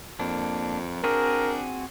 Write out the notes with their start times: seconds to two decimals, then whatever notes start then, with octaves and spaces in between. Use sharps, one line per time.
0.20 F2 A#3 D4
1.04 C4 D4 F#4 G#4 A#4